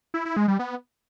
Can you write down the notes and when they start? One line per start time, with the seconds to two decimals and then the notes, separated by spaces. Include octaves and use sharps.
0.14 E4
0.25 E4
0.37 G#3
0.48 G3
0.59 B3